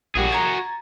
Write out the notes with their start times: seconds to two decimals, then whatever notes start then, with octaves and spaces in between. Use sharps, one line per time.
0.15 A#1 G3 F#4 G#4
0.30 A#5 G#6 A6